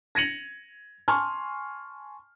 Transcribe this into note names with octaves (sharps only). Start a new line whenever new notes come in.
G#6 A#6 C#7 D#7 F7 F#7
G#5 A5 C6 C#6 F6